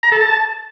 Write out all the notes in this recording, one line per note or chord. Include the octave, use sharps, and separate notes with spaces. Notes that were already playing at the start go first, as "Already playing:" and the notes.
A#5
A4
A5